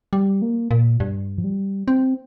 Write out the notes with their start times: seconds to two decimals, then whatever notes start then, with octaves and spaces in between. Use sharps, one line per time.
0.13 G3
0.42 A#3
0.71 A#2
1.00 G2
1.38 F3
1.44 G3
1.88 C4